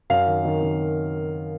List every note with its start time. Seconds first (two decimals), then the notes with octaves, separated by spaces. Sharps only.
0.10 F#2 F5
0.27 D#3
0.45 D#3
0.63 D#3